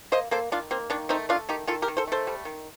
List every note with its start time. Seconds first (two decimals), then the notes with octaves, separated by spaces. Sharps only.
0.12 A#3 C5 D#5
0.31 A#3 A4 C5
0.52 D#3 D4 F4
0.71 A#3 C4
0.90 D#3 D4
1.09 A3 C4 D#4
1.29 A3 D4 F4
1.49 D#3 D#4 G4
1.67 D#3 F4 A4
1.82 G4 A#4
1.88 D#3
1.97 A4 C5
2.08 A3 A4 C5
2.27 G3
2.45 D#3